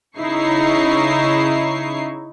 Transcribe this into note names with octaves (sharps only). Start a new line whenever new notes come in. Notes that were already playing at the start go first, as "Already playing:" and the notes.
C#3 D#4 E4 C#6 C7